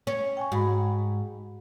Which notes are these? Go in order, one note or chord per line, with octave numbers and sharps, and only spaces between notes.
C#4
G5 G#5 C#6
G#2 F#4 B5